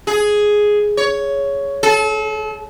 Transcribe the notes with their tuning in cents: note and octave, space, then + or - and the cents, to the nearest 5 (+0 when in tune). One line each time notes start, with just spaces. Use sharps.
G#4 +5
C#5 +10
A4 -35